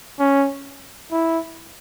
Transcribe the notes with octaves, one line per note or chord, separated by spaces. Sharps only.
C#4
E4